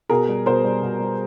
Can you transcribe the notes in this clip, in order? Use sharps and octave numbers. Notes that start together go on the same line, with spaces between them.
B2 G#4 A#4
G3
B2 A#4 C5
G3
B2
G3